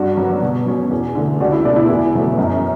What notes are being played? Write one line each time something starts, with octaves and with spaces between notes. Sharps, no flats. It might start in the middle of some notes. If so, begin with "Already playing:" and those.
Already playing: G2 D4 F#4
F#3 B3
B2
F#3 C#4
E2
D3 A3
C#2 D4 F#4
E4
B2 A3 D4
E4
E2 E4
B2 F#3 A3
F#2